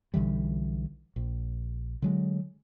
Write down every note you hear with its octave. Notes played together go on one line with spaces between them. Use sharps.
B1 D3 E3 G3
A#1
D3 F#3 G#3